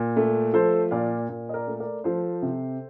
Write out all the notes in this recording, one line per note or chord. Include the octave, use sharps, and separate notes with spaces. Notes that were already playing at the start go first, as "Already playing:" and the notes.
Already playing: A#2
A3
F3 A4 C5
A#2 D5 F5
A#2
D#5
A#4 D5
A3
A#4 D5
F3 A4 C5
C3